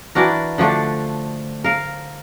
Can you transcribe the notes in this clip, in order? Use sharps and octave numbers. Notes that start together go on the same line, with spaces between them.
E3 D4 F#4 A#4
D3 F3 A3 D4
A#4 F5